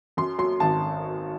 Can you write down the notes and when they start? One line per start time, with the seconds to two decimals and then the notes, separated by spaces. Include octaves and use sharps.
0.17 F#2 C6
0.38 F#3 C6
0.60 G#1 A5